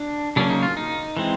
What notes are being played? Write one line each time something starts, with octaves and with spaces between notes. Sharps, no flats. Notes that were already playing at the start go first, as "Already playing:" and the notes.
Already playing: D4
C#3 F#3 A#3 C#4 D4
D#4
F4
D#4
E3 G#3 C4